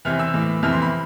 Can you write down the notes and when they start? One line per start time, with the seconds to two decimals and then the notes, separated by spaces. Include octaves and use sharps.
0.05 E2 C3 E3 F6
0.19 E6
0.34 A2 E3
0.62 F2 C3 E3 F6
0.72 C6
0.82 B5